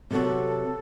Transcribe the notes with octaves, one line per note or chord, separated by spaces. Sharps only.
C3 F#3 B3 F#4 A4